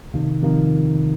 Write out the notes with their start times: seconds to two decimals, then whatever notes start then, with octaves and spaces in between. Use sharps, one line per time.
0.14 F2 C3 D#3 A#3 D#4
0.42 F2 C3 D#3 A#3 D#4